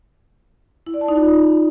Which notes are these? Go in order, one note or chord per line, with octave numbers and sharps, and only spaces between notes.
E4
D5
A5
D#4
F4